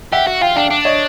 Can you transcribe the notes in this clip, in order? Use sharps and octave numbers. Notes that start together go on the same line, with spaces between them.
G4 E5 F#5
F#4
F4 F5 G5
D4 F5 G5
D4
C#5 D#5